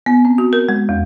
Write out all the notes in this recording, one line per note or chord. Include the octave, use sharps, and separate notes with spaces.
B3
C4
F#4
A#4
G#3
E2